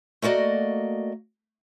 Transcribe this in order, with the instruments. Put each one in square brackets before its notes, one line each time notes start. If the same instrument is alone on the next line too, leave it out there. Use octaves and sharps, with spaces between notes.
[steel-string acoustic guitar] A3 A#3 F#4 D5 D#5